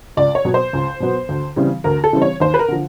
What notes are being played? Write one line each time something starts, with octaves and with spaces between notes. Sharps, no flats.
C#2 D5
C#5
B2 F#3 B3
C5
C#2
B2 F#3 B3
D2
C#3 E3 G3 C4
D2 A#4
A4
C#3 E3 G3 C4
C#5
D#2 C5
B4
A#4
D3 F3